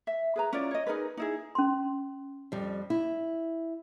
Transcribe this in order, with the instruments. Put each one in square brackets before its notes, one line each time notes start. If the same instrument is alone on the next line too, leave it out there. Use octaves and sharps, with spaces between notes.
[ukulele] E5
G#4 B4 A#5
C#4 E4 F4 D5
C#5 D#5
D#4 G#4 A#4 B4
D#4 E4 G#4
[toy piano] C#4 C6
[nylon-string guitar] F2 G3
E4